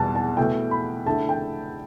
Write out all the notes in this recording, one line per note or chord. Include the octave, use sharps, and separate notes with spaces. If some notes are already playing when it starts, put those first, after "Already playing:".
Already playing: E2 B2 G3 A5
A5
B2 A3 E4 G5
B5
D3 A3 E4 A5
G5